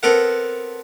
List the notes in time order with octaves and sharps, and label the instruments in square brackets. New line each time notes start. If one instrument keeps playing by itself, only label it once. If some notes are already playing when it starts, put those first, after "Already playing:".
[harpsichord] B3 C4 A4 A#4 F#5